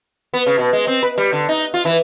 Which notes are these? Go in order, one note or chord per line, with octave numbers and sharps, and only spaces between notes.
B3
C#3
B2
G#3
C4
B4
G3
D3
D#4
F4
E3